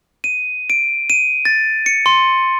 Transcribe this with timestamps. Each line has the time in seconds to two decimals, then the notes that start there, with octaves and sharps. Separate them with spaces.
0.24 D#7
0.70 D7
1.10 D#7
1.45 A6
1.86 C#7
2.06 C6